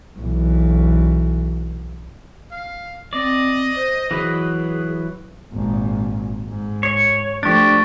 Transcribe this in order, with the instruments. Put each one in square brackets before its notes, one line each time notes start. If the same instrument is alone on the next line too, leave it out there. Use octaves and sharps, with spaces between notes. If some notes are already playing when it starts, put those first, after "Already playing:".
[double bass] B1 E3
[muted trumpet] F5
[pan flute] C4 [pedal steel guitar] D5 [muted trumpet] D#5
[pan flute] C5
[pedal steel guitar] E3 F#3 B4 [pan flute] G#4
[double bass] G#1 A#2
G#2
[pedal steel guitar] C#5
[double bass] F3 A3 [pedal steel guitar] D4 G4 [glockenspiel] C#6 A6